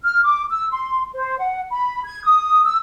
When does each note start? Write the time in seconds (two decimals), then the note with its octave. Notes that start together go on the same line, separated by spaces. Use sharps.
0.02 F6
0.24 D6
0.51 E6
0.72 C6
1.14 C5
1.39 F#5
1.71 B5
2.05 G#6
2.24 D#6
2.64 E6